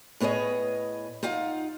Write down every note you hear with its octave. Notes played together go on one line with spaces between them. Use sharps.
A2 B3 G#4 C#5 D#5
D#4 F4 F5 F#5